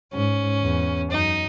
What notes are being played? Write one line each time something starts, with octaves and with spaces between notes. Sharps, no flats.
G#2 C#4
E2
F#2 D#4